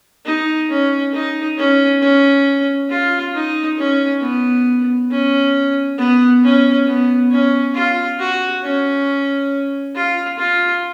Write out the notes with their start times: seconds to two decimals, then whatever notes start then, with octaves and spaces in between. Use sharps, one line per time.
0.25 D#4
0.69 C#4
1.13 D#4
1.57 C#4
2.01 C#4
2.89 F4
3.34 D#4
3.78 C#4
4.22 B3
5.11 C#4
5.98 B3
6.43 C#4
6.86 B3
7.31 C#4
7.74 F4
8.19 F#4
8.63 C#4
9.95 F4
10.38 F4